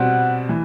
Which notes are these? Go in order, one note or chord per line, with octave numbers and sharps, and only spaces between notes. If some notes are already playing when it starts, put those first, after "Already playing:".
Already playing: B2 G3 C4 F#5
E3